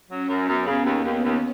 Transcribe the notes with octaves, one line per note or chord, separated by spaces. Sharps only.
F#3 C#4
F#2
F#2 B3
C#3
D#2
D#2
D#2